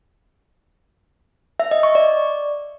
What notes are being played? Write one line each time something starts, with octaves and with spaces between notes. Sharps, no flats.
E5
D#5
C#6
D5